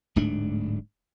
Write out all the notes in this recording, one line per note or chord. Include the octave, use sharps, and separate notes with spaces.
D1 G#2 A3 D4